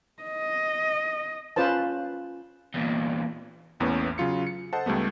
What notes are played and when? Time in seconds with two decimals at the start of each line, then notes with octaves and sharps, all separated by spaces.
0.23 D#5
1.56 C#4 F4 B4 C5 A5
2.74 E2 A#2
3.80 A1 E2 A2 A#3 B3 C#4
4.18 C#3 F#3 F4 C#7
4.47 C#7
4.73 A4 C5 D#5 F#5 A5
4.86 C#2 G3 A3 B3